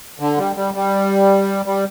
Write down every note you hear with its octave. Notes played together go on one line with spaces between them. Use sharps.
D3
G3
G3
G3
G3